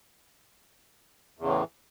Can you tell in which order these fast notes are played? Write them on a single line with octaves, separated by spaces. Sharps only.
E2 C#3 A2 E3